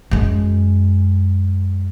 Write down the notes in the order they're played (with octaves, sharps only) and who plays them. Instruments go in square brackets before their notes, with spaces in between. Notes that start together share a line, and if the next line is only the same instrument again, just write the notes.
[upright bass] F#2 G#3